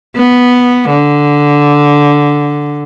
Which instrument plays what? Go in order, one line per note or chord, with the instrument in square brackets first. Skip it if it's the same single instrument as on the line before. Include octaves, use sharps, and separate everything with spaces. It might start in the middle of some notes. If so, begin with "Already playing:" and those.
[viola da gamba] B3
D3